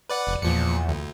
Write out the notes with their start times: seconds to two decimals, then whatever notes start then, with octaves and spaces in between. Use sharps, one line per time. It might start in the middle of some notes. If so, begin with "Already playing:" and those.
0.09 B4 D5 F#5
0.27 F1
0.42 E2 A#2 F3 C#7
0.89 D2